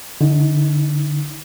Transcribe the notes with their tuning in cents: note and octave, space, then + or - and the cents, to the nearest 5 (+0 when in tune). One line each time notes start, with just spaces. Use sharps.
D3 +0 D#4 +35